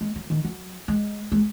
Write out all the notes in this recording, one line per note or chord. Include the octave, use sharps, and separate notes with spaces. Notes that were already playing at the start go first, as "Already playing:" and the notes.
G#3
F#3
D#3
F#3
G#3
G#3